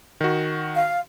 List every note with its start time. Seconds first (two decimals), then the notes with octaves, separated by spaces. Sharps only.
0.21 D#3 F#4
0.75 F5